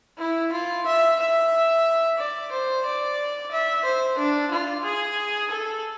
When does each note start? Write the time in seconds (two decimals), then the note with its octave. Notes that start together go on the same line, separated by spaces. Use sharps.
0.19 E4
0.53 F4
0.86 E5
1.19 E5
2.18 D5
2.52 C5
2.85 D5
3.51 E5
3.84 C5
4.18 D4
4.51 F4
4.84 G#4
5.51 A4